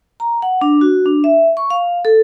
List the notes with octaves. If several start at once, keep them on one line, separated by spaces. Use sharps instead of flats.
A#5
F#5
D4
F#4
D4
E5
C#6
F5
A4